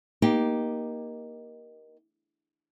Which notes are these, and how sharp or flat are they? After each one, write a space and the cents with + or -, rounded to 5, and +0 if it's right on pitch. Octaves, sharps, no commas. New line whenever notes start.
A#3 +15 D#4 +0 G4 -5